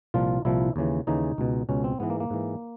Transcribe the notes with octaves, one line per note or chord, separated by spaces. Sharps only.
C2 A#2 F3 F4
C2 A#2 F3 E4
D#2 C#3 E3
D#2 C#3 E3 D#4
C#2 B2
C#2 B2 C#4
C4
G#2 E3 B3
A#3
A#3
G#2 E3